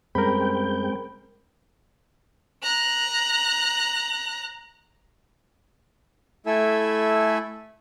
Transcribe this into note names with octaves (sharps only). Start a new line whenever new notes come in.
F#2 G3 G#3 C4 A#4 G5 B5
A#5 F#6
A3 E4 A4 E5 G#5 E6